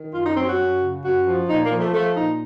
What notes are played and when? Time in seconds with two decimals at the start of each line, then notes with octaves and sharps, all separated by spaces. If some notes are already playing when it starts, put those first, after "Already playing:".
Already playing: D#3
0.14 F#2 F4
0.26 D#4
0.37 F#3 C4
0.48 F#4
0.59 F#2
0.81 C#3
1.04 F#2 F#4
1.27 F3
1.48 A#2 D#4
1.64 A#3
1.71 F3
1.79 A3
1.93 F3 A3
2.16 A#2 D#4